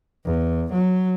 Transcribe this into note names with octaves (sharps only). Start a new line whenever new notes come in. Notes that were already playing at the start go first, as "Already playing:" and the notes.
E2
F#3